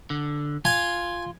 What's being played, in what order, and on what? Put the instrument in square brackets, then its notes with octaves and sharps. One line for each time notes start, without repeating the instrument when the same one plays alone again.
[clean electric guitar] D3
[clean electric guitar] F4 [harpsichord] G#5